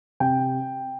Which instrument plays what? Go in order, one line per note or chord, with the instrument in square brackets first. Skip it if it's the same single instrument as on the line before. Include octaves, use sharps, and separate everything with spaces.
[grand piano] C3 G5